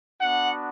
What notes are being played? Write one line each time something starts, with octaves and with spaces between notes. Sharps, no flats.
B3 D4 F#4 F#5